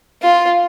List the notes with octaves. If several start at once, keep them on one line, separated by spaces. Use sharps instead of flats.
F4